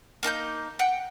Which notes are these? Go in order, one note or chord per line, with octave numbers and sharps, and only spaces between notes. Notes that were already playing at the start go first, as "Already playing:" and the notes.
A#3 D#4 G#5 G6
F#5 G5